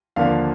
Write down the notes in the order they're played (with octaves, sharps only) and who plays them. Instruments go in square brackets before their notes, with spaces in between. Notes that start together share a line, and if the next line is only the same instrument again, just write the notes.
[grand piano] D#2 D3 F3 A#3 D4 F5